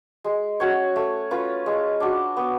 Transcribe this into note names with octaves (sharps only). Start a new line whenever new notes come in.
G#3
C#4 F#4 C#5
A3
C#4 F4 B4
G#3
D4 F#4
B3